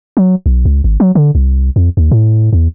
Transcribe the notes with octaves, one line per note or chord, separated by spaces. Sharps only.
F#3
B1
C#2
G#1
F#3
D3
C2
F2
D#2
A2
E2